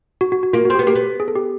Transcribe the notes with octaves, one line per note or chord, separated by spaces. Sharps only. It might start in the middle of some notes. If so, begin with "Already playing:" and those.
F#4
F#4
F#4
A#3 F4
C4 F#4
G4
B3
A#3 G4
B3
G#4
A4
G4